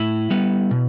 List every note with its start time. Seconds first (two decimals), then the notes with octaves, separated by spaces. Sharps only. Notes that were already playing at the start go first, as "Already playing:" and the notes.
Already playing: A2 E4
0.30 G3 B3
0.71 B2